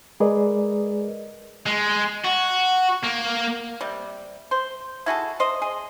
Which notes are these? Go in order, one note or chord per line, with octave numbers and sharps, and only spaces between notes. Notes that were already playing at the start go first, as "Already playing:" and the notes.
G#3 G#4 A#4 B4 D5 D#5
G#3
F#4
A#3
C3 G3
C5
E4 F#4 G#4 A4
C5 D#5
G#4